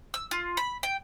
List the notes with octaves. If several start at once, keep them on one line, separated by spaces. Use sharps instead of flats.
E6
F4
B5
G5